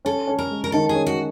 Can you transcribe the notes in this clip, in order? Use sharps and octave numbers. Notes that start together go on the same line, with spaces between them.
C#4 A4
C#4
A#4
G#3
A#4
D#3 A4
G#4
C#4
F#4